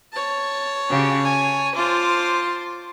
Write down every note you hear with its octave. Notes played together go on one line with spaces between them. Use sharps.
C#5 A5
C#3 F#4 G4
G#5
F4 C5 A5 C6 D6